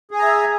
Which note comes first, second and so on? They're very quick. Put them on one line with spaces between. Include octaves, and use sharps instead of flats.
G#4 G#5 A#5 E5